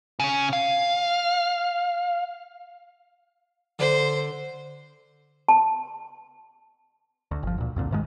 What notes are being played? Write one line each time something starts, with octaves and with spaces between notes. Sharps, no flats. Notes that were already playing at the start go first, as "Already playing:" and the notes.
C#3 C#4
F5
D3 C5
A5
D2
G1 F3
D2 A#2
C2 F2 A#2 D3
G#2 D#3 E3 G#3